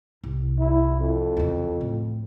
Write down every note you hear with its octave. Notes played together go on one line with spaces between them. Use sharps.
C2
E4
F2
E2 C#3
A2